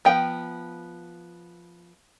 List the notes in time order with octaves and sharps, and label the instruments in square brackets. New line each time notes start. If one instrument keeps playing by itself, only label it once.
[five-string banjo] F3 B3 G5